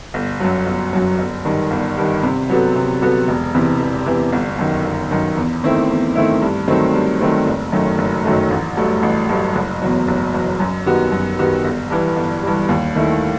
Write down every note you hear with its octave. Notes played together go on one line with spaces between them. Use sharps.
G1
F#2 F#3
G1
F#2 F#3
G1
G2 D#3
G1
G2 D#3
C3
F#3 B3 F#4 A4
C3
F#3 B3 F#4 A4
E1
E2 C3 E3
E1
E2 C3 E3
G1
F#2 D#3
G1
F#2 D#3
E2
D#3 A3 C4 E4
E2
D#3 A3 C4 E4
G2
D#3 F#3 A3 C4
G2
D#3 F#3 A3 C4
F#1
F#2 D#3 F#3 A3
F#1
F#2 D#3 F#3 A3
A1
G2 F#3 A3
A1
G2 F#3 A3
F#1
E2 B2 F#3
F#1
E2 B2 F#3
F#2
D#3 G3 B3 F#4
F#2
D#3 G3 B3 F#4
G1
G2 E3 G3
G1
G2 E3 G3
D#2
D#3 A3 E4